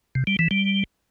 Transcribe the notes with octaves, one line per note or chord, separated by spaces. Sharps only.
C3
G3
E3
G3